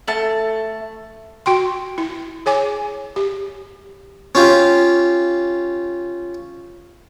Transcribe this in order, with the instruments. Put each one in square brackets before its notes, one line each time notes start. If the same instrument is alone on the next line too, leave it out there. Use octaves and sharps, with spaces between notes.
[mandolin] A3 A5
[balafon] F#4 G5 C6
E4
G#4 C#5 G#5 D6
G4
[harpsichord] C#4 F4 G4